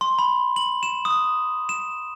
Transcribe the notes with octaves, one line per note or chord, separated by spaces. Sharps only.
C6
B5
F#7
E7
D#6
E7